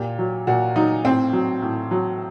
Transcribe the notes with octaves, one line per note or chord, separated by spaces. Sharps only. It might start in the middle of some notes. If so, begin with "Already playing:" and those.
Already playing: A#2 G4
F#3
A#2 F#4
F#3 D#4
A2 C4
F#3
A2
F#3